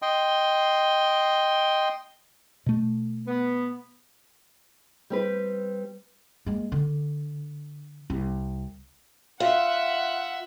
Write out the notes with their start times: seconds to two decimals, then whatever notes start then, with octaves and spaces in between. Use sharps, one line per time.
0.02 D#5 G5 C6
2.66 B2 A3
3.27 B3
5.10 G3 C4 B4
6.46 G#3 A#3
6.72 D3
8.10 C2
9.40 F4 E5 F#5